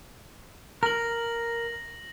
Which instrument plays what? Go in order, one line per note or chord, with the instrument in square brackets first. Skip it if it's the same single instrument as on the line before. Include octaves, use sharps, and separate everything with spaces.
[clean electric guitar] A#4 [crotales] A#6 F#7